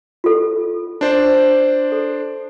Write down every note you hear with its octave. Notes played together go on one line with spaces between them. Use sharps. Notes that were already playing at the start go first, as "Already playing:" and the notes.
F4 A4
D4 C5 D5
A4